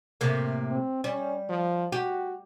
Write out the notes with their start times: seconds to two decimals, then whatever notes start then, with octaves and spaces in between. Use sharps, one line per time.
0.21 A2 C3 A#3
0.69 C4
1.04 G3 C#4
1.49 F3
1.92 F#4 G4